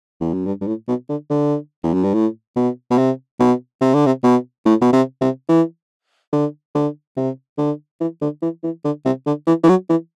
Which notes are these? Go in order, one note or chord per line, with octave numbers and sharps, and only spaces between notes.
E2
F#2
G2
G2
A2
B2
D3
D3
E2
F#2
G2
A2
B2
B2
C3
B2
C3
D3
C3
B2
A2
B2
C3
C3
E3
D3
D3
C3
D3
E3
D3
E3
E3
D3
C3
D3
E3
E3
F#3
E3